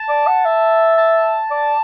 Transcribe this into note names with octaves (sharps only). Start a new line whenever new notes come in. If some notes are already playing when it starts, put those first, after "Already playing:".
Already playing: A5
D5
F#5
E5
A5
D5